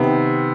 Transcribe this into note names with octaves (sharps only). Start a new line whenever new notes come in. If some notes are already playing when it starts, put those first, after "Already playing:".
Already playing: C3 D#3 B3